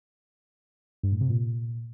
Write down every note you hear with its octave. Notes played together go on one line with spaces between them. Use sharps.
G2
A2
C3
A#2